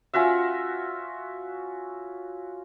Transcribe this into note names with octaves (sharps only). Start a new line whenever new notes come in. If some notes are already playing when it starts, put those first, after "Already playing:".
C#4 F4 F#4 E5